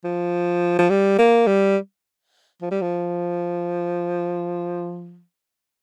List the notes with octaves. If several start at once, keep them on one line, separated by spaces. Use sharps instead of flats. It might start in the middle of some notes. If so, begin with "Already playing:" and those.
F3
F3
G3
A#3
G3
F3
G3
F3